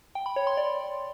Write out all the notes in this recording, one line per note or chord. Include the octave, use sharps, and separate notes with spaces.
G5
B5
C#5
C6
D5